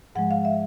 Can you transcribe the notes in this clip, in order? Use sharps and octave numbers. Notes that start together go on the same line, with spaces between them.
G#2 F3 G#3 F#5
F5
E5